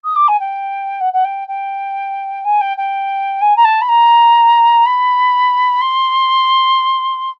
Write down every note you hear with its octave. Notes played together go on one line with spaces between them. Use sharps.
D#6
D6
G#5
G5
F#5
F#5
G5
G5
G#5
G5
G5
G#5
A#5
A5
B5
A#5
B5
C6